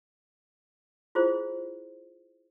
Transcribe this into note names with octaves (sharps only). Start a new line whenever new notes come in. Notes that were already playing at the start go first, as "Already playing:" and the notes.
E4 F4 G#4 C5